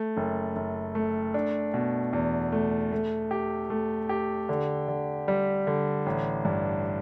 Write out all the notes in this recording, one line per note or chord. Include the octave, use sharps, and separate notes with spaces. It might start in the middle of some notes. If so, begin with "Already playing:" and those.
Already playing: A3
F#1
F#1
A3
D4
B2
E2
A3
A3
G4
A3
G4
D3
D3
G3
D3
A1
G2